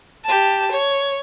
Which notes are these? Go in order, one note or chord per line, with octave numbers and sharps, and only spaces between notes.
G4 A5
C#5